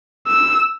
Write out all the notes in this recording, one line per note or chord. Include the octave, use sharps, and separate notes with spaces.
E6